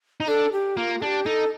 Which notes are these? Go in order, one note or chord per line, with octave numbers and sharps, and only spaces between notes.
D#4
D4 A4
G4
A#3 F4
D4 G4 A4
D#4 A4